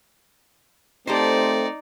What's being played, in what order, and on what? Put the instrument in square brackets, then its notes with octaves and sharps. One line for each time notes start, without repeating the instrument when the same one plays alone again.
[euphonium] A3 [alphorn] C4 [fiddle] D#4 D5 [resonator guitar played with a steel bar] G4 A4 C5